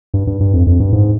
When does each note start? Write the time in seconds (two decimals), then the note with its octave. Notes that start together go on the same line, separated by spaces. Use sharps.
0.14 G2
0.27 G2
0.40 G2
0.53 F2
0.67 F2
0.80 G2
0.93 G#2